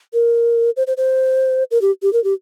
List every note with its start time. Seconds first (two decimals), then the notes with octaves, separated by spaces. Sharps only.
0.13 A#4
0.77 C5
0.87 C5
0.97 C5
1.71 A#4
1.81 G4
2.02 G4
2.13 A#4
2.24 G4